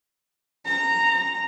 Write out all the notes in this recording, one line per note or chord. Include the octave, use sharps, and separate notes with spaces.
A#5